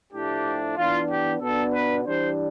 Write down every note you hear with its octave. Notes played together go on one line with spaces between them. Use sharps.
A2 F3 A3 D4 G4
E3 B3 D4 F4
G4
B2 B3 D4 A4
B4
E3 G3 D4 C5